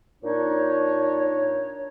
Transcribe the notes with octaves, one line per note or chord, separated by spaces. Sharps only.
A#2 D4 D#4 C#5